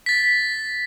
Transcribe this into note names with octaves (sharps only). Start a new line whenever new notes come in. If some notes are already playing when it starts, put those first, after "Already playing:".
A6 B6